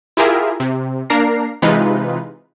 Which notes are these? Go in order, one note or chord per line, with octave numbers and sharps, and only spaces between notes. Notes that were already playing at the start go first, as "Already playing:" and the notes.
E4 F4 G4 G#4 A#4 E5
C3
A#3 D4 A#4 A#5 C7
C3 E3 G#3 D#4 F4 B4